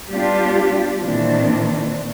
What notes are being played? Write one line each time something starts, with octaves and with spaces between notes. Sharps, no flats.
G3 B3 D4 F4 G4
A#2 D#3 E3 C4 D4